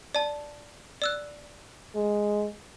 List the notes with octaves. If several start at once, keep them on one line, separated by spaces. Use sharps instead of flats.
D5 A5
D5 E6 F#6
G#3